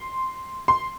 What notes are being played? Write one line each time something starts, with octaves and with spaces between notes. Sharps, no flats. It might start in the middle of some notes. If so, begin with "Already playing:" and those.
Already playing: C6
C6